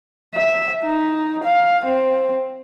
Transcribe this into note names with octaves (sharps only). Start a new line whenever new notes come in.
E5
D#4
F5
C4